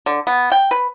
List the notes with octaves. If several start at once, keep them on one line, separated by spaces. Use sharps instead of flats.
D3
B3
G5
B4